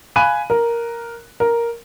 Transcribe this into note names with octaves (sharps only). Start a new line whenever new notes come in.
F5 G#5 B5 F#6 D#7
A#4
A#4